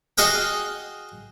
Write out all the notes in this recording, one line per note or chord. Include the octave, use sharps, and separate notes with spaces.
F#4 G#4 D#5 F5 G5